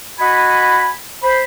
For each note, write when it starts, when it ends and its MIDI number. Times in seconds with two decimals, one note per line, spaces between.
0.19 0.90 66
0.19 0.90 75
0.19 0.90 78
0.19 0.90 80
0.19 0.90 83
1.23 1.43 72
1.23 1.43 83